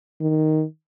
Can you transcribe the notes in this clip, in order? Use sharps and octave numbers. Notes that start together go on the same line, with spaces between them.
D#3